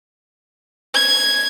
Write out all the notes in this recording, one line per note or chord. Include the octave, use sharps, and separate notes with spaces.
G#6